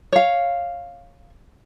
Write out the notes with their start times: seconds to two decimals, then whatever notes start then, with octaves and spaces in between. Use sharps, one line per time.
0.12 C#5 F5